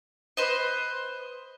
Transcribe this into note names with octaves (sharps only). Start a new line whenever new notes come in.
B4 C5 D#5